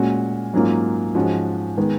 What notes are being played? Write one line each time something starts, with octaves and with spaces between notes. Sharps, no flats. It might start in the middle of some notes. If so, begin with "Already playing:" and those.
Already playing: A#2 G#3 C#4 F#4
G#2 F#3 A#3 C#4 F4
G#2 F3 G#3 C#4 F#4
D#3 G#3 B3